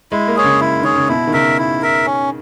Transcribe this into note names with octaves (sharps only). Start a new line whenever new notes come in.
G#3 E4
A#3
G#4 C#5
C#3
E4
D#3 G#4 C#5
C#3
B2 E4
D#3
C#3 A#4 E5
E4
A#4 E5
C#4